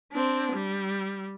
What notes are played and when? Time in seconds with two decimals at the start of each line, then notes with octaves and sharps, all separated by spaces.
0.12 C4 D4
0.52 G3